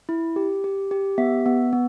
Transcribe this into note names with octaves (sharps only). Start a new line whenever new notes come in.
E4
G4
G4
G4
B3 E5
B3
B3